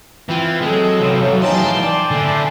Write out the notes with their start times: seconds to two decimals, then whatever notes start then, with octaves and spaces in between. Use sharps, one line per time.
0.29 E3 C4 E4 F4 G5
0.62 F#3 G#3 C4 A4
1.00 C3 E3 F3 C4
1.41 D#4 G#4 G5 A5 C6
1.81 D5 G#5
2.11 D3 E4